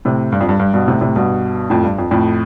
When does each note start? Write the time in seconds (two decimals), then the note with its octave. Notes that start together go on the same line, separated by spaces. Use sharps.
0.05 A2 C3
0.32 G2
0.41 F2
0.49 G2
0.60 G2
0.74 G2 B2
0.88 A2 C3
1.01 A2 C3
1.16 G2 B2
1.70 F2 A2
1.84 G2
1.99 F2
2.11 F2 A2